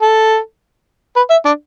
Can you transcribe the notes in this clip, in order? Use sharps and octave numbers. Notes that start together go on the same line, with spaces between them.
A4
B4
E5
D4